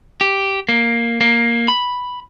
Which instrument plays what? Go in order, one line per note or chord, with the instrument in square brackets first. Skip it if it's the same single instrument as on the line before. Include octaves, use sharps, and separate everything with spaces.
[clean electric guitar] G4
A#3
A#3
B5